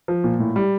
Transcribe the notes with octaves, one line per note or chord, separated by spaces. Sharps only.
F3
A#2
A2
G3